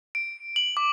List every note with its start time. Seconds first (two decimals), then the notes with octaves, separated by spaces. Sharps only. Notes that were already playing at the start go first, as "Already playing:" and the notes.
0.15 D7
0.56 F#7
0.77 D6